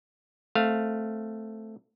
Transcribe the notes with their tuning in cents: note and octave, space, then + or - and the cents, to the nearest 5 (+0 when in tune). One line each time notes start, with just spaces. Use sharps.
A3 +0 C4 +0 F5 +0